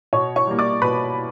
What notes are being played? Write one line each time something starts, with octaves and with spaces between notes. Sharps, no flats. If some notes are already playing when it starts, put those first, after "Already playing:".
B2 C#5 C#6
C#5 C#6
G3 A#3
D5 D6
B2 B4 B5